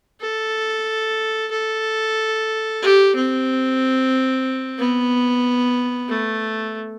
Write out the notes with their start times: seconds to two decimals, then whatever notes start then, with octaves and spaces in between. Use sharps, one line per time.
0.21 A4
1.51 A4
2.82 G4
3.15 C4
4.79 B3
6.09 A3